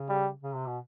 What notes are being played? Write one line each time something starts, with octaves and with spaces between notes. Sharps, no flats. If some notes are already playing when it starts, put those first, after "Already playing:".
Already playing: C#3
G3
C#3
C3
B2